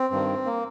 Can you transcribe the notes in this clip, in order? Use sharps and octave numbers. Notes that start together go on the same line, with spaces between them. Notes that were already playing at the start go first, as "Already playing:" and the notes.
Already playing: C4
G2 D#3
A#3